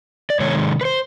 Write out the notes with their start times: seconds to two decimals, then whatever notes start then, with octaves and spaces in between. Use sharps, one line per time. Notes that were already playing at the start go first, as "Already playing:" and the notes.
0.30 D5
0.40 C3 D#3 G#3 C#5
0.81 B4
0.85 C5